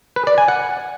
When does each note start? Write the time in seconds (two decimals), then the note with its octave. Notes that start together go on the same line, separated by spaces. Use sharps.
0.16 B4
0.27 D5
0.38 G#5
0.48 F#5